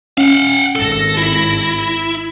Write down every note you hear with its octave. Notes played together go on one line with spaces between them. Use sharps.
C#4 F5 F#5
G#1 A4 A#6
E4